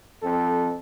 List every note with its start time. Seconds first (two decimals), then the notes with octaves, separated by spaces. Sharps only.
0.22 F2 C4 A4